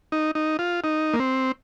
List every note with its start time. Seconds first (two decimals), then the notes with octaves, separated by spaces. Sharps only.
0.12 D#4
0.35 D#4
0.59 F4
0.84 D#4
1.14 A#3
1.19 C4